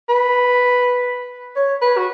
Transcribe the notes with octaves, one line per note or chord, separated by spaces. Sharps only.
B4
C#5
B4
F#4